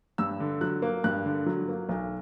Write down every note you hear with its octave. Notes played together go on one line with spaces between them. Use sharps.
G2 E6
D3
F#3 F#6
A#3
G2 F#6
D3
F#3
A#3
B1